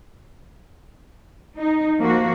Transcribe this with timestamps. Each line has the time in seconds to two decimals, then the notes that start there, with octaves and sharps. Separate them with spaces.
1.59 D#4
2.01 F3 A#3 F#4